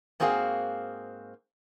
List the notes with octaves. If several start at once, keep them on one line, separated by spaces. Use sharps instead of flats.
G#2 A#3 C4 F#4 G#4 F5